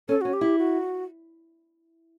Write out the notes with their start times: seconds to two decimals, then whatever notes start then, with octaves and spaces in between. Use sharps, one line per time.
0.09 C#4 A4
0.21 C#4 F#4
0.33 G4
0.41 E4
0.59 F#4